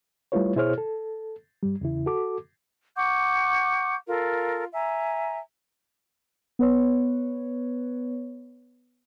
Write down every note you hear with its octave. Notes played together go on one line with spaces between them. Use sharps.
G3 A3 E4 F4 B4 C#5
B2 E4 G#4 C5 C#5 F6
A4
G2 G3
E2 C#3 E4
F#4 A4 D6
F#5 C#6 D6 G6
F4 A4 A#4
E5 G#5 A#5
B3 B4 C#5